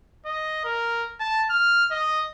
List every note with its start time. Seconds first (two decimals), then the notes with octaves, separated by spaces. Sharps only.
0.25 D#5
0.64 A#4
1.20 A5
1.50 F6
1.91 D#5